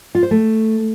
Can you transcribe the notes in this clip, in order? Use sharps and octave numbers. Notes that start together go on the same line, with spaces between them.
F4
C5
A3